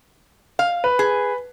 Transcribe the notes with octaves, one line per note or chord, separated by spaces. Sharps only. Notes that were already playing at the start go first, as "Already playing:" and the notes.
F5
B4
G#4